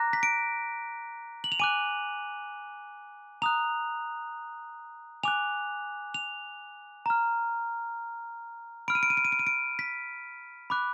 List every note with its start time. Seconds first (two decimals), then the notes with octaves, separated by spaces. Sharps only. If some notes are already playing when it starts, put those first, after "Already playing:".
Already playing: A#5 D6 F#6 A#6
0.13 B6
0.23 D7
1.44 F#7
1.52 F7
1.59 G#5 D6 F#6 D#7
3.42 A#5 D#6 F#6 F7
5.23 G#5 D6 F#6 F7
6.14 F7
7.06 A#5 F6
8.88 B5 F6 D7
8.95 D#7
9.03 D7
9.10 D#7
9.17 D7
9.25 D#7
9.32 D7
9.39 D#7
9.47 D7
9.79 B6
10.70 B5 D6 F#6